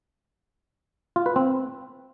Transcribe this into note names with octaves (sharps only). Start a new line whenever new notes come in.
F4
B4
C4